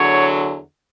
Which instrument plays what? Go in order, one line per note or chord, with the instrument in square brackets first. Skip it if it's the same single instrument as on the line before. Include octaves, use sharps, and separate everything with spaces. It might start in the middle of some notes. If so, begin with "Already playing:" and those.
Already playing: [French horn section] E2 D3 F#3 C#5